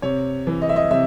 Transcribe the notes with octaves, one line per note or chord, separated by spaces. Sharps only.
C3 C#5
E3
D#5
E5
D#5
C3 E5